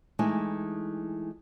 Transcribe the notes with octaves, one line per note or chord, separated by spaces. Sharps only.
E3 G#3 A3 D#4 E4